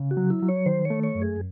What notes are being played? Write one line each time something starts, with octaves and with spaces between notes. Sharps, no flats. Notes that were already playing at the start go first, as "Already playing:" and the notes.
Already playing: C#3
F#4
F#3
E4
F#3
C#5
D#3 C5
C#5
A3
C#5
F#2
G#4